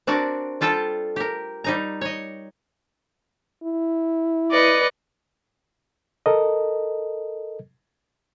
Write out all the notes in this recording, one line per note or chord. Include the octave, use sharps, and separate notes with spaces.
C4 D4 F#4 A#4 D5
G3 F4 A4 G5 A5
G4 A#4
G3 D#4 A#5
C#5 D#5
E4
B4 D5 D#5 C#7
A4 A#4 D#5